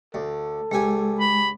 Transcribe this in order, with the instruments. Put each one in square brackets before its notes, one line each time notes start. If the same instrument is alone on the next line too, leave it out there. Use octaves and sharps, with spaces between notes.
[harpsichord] D2 [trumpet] A4
[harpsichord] C#2 G4 G#5 [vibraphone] G#3
[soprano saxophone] B5